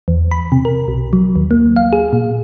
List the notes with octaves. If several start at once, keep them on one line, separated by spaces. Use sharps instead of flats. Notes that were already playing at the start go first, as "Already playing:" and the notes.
E2
B5
C3
A#4
B1
F#3
D#2
A#3
F5
G#4
A#2